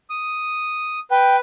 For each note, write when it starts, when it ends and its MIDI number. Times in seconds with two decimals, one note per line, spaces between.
0.10 0.99 87
1.11 1.40 71
1.11 1.36 79